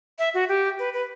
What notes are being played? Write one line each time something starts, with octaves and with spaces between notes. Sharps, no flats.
E5
F#4
G4
B4
B4